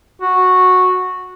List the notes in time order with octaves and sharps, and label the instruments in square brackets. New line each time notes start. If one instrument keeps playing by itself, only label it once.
[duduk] F#4